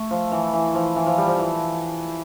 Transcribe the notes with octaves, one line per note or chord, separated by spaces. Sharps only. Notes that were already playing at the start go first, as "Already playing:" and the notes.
Already playing: A3
F3
E3
E3
F3
E3
F3
G3
F3
E3